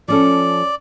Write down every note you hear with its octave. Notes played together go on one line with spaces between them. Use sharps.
F3 C#4 A4 D5